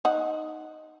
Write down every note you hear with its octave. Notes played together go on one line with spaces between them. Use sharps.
D#4 F#5